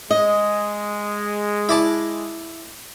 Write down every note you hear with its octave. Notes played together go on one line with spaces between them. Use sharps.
G#3 D#5
E4 D5 A5